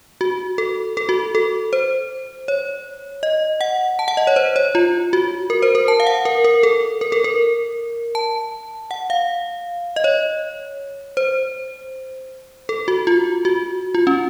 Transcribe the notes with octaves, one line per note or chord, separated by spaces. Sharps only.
F#4
A4
A4
F#4
A4
C5
C#5
D#5
F#5
A5
F#5
D#5
C#5
C5
C#5
F4
F#4
A#4
C5
A#4
A5
F5
F#5
A#4
A#4
A4
A#4
A4
A#4
A5
F#5
F5
D#5
C#5
C5
A4
F#4
F4
F#4
F4
C#4